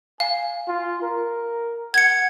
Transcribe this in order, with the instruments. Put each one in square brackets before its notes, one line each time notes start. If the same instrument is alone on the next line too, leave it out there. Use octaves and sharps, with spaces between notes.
[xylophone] F5 [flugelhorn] G#5
[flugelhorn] F4
A#4
[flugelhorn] F#5 [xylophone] G#6 C#7